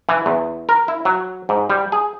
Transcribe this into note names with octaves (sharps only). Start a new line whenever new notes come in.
E3
E2
A#4
E4
F#3
G#2
G3
G#4